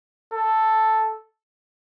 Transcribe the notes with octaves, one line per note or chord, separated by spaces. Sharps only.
A4